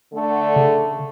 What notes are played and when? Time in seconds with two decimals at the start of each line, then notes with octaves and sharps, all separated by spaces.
0.13 D3 A3
0.56 C#3